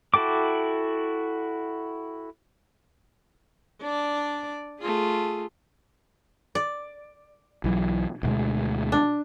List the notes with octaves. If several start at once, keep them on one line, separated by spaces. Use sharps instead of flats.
E4 F#4 A4 G5 D6
D4 D5
A3 F4 G#4
D5
B1 E3 F#3
D2 B2 G#3
D4